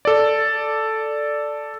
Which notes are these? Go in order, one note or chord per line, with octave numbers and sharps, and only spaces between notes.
A4 D5